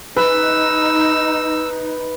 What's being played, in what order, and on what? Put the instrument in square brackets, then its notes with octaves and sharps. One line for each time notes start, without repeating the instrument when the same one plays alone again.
[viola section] D#4 [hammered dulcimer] B4 [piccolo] E6